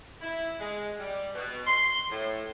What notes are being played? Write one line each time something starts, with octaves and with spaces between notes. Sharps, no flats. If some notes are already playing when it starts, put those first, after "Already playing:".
E4
G#3
G3
B2
C6
A2